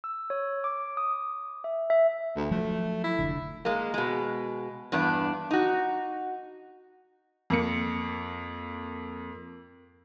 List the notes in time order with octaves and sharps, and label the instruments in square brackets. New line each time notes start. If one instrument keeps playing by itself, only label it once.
[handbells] E6
C#5
D6
D#6
E5
E5
[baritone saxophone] D2
[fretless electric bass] F3 F#3 [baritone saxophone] A3
[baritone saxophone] E4
[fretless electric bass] F1 A#1 D3
[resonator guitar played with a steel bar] G#3 A#3
B2 G#3
E2 G2 B3 D4
D#4 F#4
[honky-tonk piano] F2 A#3 C#7